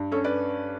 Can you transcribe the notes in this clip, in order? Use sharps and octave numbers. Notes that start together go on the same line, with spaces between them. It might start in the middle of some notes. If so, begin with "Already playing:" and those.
Already playing: G2
C#4 A4 C#5
B4 D5